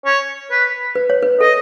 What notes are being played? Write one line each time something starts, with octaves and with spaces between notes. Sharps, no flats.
C#5
B4
B4
C#5
B4
A4 D#5